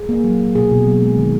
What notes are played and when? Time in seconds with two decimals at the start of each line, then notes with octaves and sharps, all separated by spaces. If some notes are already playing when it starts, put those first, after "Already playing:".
Already playing: G#4
0.09 A#3
0.24 F#3
0.40 F#3
0.55 B2 G#4
0.71 B2
0.87 F#3
1.02 G#3
1.17 D#3